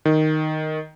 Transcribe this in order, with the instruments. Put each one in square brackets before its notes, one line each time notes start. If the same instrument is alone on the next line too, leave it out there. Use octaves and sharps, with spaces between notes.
[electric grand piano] D#3